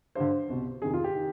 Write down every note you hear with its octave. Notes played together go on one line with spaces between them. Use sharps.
G2 D3 C5
C2 B2
F2 C3 D#3 G#4
F4
G4
D#3